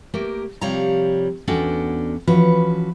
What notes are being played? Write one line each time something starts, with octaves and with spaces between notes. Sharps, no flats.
A3 A#3 G4 A#4
C3 F3 G3 C#5 F5 A#5
E2 C#4 D4 F#4 A4 G5
E3 F3 C#4 F#4 B4